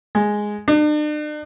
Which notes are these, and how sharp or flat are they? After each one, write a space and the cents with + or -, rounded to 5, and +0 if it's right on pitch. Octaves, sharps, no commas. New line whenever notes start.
G#3 +0
D4 +45